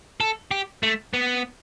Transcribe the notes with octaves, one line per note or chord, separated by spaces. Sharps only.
A4
G4
A3
B3